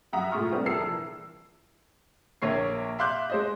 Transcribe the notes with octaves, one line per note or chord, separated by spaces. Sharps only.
F#2 E5 F#5 A#5 D#6
A2 G#3 F4 C#6 F6
G3 A3 B3 C4 D4 G4
A#1 G#4 A#4 A5 E6 C7
E3
A#1 A#3 C#5 C7
E5 F5 C6 D6 F#6 G6
G#3 C5 D#5